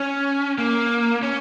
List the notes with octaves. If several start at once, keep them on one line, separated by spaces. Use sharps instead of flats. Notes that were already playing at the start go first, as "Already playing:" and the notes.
Already playing: C#4
A#3
C#4